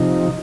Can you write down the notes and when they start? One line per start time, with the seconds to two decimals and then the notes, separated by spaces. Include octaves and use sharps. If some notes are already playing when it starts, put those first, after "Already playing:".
Already playing: C3 F3 D#4